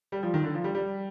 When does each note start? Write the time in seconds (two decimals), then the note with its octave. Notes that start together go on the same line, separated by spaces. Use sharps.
0.12 G3
0.23 F3
0.34 D#3
0.44 D3
0.54 F3
0.64 G3
0.75 G3